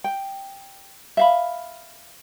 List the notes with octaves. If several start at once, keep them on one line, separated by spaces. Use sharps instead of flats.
G5
E5 F5 B5